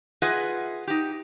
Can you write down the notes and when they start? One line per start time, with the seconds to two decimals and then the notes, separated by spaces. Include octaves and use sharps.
0.22 F4 G#4 B4 D#5 E5 F#5
0.87 D#4 G4